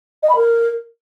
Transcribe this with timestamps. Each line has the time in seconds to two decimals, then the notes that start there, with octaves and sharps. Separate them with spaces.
0.22 D#5
0.29 B5
0.35 A#4